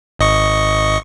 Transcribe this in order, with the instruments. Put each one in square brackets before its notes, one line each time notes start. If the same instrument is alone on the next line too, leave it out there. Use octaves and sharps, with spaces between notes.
[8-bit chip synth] G#1 D#5 C#6